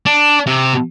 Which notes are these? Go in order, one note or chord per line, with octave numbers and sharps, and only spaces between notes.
D4
C3